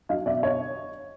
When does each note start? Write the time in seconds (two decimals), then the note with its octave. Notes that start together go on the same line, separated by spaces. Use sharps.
0.09 F#3 D#5 F5
0.26 B2 D5 E5
0.43 C#5 D#5